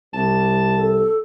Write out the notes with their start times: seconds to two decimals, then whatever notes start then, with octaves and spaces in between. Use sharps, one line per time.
0.13 C2 A5
0.77 A4